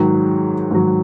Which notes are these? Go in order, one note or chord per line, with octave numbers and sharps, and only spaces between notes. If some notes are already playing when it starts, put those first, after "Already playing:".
Already playing: G#2 D#3 F#3
G#2 D#3 F#3